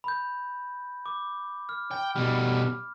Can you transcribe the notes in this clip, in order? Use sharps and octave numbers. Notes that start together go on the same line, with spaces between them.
B5 G6
D6
F6
G5
B2 G3 F6